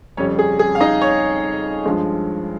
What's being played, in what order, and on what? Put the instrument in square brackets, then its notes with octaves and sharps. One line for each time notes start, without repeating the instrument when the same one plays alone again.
[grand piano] F2 C#3 G3 C#4 C#5
G#4
G#4
F5
D#4 D#5
C#5 C#6
G2 F3 G#3